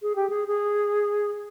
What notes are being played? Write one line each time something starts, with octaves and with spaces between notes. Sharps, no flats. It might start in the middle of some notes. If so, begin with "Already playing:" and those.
G#4
G4
G#4
G#4